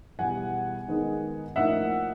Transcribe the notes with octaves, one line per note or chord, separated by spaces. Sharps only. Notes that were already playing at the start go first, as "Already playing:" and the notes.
E2 B2 G3 F#5 G#5
D#3 G#3 B3 D#4
A2 F3 A#3 D#4 E5 F#5